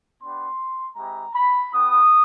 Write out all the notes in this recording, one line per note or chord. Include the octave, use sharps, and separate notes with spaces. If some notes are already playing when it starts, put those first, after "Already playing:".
B3 D4 G4 C6
G#3 C4 E4 G4 A#5
B5
B3 E4 G4 D#6